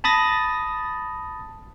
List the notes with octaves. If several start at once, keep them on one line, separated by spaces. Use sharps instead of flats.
A5 B5 D#6 A6 A#6